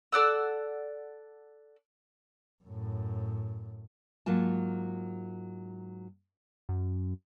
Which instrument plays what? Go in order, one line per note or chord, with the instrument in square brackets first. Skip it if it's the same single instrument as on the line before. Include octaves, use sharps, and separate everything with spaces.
[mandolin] A4 D5 F#5 E6
[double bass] F#2 A2
[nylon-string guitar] G#2 F#3 A#3 F4 A5
[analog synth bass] F#2